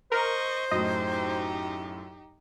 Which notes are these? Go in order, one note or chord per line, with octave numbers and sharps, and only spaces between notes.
A#4 C5 D#5 C#6
F#2 A2 D#4 G4 D#5